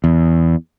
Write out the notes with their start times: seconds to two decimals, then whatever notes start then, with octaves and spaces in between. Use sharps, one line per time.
0.04 E2